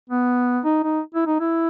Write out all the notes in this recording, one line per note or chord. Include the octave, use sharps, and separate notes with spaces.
B3
D#4
D#4
E4
D#4
E4